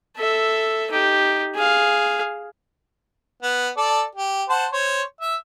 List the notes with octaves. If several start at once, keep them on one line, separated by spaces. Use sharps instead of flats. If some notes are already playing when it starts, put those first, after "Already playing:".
A4 E5
D#4 G4
G#4 F5
B3
A4 D5
G4
C5 F#5 A5
C5 C#5
E5